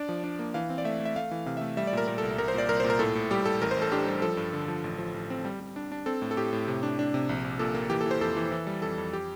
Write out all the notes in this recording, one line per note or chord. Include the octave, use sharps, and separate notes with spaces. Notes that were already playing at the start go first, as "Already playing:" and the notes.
Already playing: D4 D5
F3
D4
A#3
E3 F5
C4
D5
A3 E5
A3
E5
A3 F5
E3
C3 F5
E5
A3
G3 E5
D5
A#2 A#4
A#2 A#4
A4
C2
C2 A#4
C5
A#2 D5
C2 A#4
C5
A#2
A#4
A2 A4
A2
G3 G4
A2 A4
A1 A#4
C5
A1
A4
D4 G4
G3
F3 A4
G2
D3
F3
A1
F3
A1
C4
G3
G3
D4
D4
C4 A4
A2
A4
A2 G4
A2
C3
D4
D4
C3
A#1
A#1
A#2 A4
A#3
E3 G4
A4
E3
C5
F2 A4
E3
E3
G3
F2 A4
F2
G4